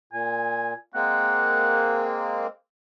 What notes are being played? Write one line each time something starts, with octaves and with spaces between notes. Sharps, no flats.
A#2 G#5
G#3 A#3 C4 F#5